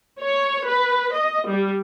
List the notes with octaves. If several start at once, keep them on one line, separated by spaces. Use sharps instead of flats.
C#5
B4
D#5
G3